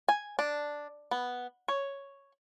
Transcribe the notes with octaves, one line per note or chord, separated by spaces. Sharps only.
G#5
D4
B3
C#5